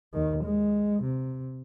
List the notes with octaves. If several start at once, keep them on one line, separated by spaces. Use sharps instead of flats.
D#2 D#3
G#3
C3